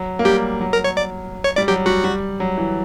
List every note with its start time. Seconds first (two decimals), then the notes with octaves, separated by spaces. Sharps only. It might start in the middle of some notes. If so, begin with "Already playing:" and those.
Already playing: F#3
0.19 A#3
0.25 G3 G4
0.61 F#3
0.73 A#4
0.84 C#5
0.97 D5
1.44 C#5
1.56 G3 D5
1.68 F#3 G4
1.86 G3 F#4
2.04 G3
2.40 F#3
2.58 E3